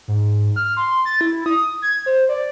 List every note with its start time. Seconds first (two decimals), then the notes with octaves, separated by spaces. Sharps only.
0.08 G#2
0.56 F6
0.77 C6
1.05 A6
1.21 E4
1.46 D#6
1.82 G#6
2.06 C5
2.29 D5